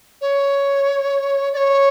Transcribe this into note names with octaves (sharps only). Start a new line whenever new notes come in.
C#5
D5
C#5